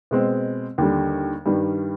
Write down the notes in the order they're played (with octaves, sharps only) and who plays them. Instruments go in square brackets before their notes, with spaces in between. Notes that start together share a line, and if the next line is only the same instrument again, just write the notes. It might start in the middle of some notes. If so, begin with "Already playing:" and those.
[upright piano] B2 G#3 C4
D#2 D3 G3
G2 D#3 G3